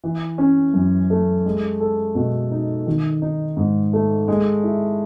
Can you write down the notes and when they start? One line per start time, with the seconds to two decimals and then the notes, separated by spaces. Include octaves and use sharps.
0.04 E3
0.38 C#4
0.74 F#2
1.10 A3
1.45 G#3
1.80 A4
2.15 B2
2.51 D#4
2.87 D#3
3.22 D#4
3.57 G#2
3.93 A3
4.28 G#3
4.63 E4